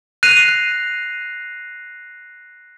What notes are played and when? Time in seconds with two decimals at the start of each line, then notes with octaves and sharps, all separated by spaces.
0.23 F#6 A#6 C7 D#7 F7